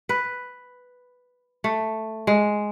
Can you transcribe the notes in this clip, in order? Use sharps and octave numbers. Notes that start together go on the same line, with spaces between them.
B4
A3
G#3